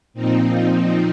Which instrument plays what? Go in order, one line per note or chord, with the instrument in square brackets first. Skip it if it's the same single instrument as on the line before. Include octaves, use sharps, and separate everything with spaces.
[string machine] A#2 F3 C4 D#4